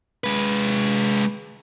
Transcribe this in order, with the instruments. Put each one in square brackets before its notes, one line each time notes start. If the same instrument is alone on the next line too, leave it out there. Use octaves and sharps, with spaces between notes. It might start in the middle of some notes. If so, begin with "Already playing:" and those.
[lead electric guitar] G#3 B4